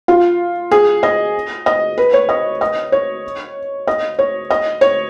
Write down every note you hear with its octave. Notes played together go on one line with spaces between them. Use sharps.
F4
G#4
D#5
D#5
B4
C#5
D#5
D#5
C#5
D#5
C#5
D#5
C#5